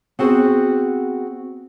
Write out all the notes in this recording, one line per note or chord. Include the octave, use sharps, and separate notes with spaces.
B3 C4 F#4 G#4 C5